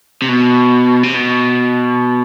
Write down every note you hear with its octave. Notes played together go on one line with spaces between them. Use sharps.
C3
B2
C3
B2